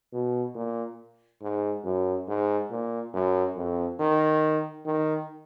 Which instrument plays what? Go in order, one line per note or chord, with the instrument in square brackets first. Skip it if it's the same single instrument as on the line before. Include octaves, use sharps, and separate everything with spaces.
[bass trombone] B2
A#2
G#2
F#2
G#2
A#2
F#2
F2
D#3
D#3